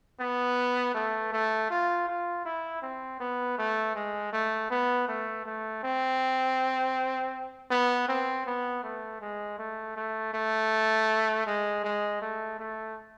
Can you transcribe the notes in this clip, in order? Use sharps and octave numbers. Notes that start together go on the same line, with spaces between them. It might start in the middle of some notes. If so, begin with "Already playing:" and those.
B3
A3
A3
F4
F4
E4
C4
B3
A3
G#3
A3
B3
A3
A3
C4
B3
C4
B3
A3
G#3
A3
A3
A3
G#3
G#3
A3
A3